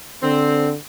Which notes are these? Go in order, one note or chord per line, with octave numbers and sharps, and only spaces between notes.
D3 C4